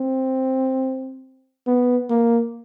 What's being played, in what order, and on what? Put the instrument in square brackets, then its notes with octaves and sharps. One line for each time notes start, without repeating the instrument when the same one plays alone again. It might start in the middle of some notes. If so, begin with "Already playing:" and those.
Already playing: [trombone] C4
B3
A#3